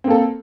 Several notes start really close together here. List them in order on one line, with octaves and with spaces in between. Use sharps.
C4 A#3 A4